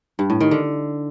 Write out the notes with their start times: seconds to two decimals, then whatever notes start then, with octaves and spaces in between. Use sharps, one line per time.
0.19 G2
0.30 A2
0.41 D#3
0.51 D3